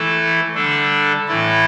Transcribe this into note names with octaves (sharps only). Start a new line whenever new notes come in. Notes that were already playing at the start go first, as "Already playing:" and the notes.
Already playing: E3 A3 E4 A4
D3 G3 D4 A4
A2 E3 A3 E4 A4